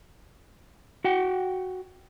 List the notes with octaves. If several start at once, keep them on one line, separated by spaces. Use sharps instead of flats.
F#4 F#5 G5